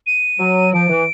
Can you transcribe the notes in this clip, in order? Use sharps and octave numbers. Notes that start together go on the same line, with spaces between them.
D#7
F#3
F3 D7
E3